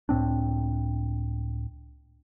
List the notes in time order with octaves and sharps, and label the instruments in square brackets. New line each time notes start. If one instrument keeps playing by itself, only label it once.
[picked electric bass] C#2 A2 C4 D4